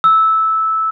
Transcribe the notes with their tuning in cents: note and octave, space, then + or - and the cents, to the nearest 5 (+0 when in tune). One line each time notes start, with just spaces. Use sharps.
E6 -10